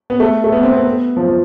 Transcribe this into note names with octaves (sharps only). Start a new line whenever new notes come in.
B3
A3
A3
B3
C4
B3
B3
F3
F3